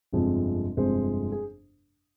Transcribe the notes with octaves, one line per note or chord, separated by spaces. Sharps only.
G1 F2 C3 F3 G#3
G1 F2 C3 F3 G#3 C5
G#4